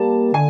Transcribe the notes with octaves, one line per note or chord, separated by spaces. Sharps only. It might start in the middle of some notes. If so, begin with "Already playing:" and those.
Already playing: G3 A#3 A5
D3 G#5